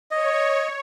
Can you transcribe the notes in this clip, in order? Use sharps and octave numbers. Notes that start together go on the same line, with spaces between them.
C#5 D#5